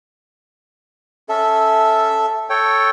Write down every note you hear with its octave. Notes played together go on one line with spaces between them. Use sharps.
C#4 A4 E5
A4 C#5 G5